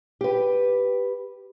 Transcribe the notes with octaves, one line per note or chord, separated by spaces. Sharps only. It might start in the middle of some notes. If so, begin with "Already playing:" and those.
G4 B4